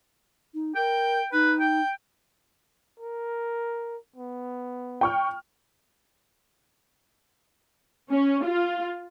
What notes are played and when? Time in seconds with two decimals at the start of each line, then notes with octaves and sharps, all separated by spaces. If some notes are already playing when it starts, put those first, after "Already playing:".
0.54 D#4
0.75 A#4 G5
1.32 D#4 B4
1.60 G5
3.00 A#4
4.16 B3
5.01 G5 C#6 F6
8.10 C#4
8.44 F4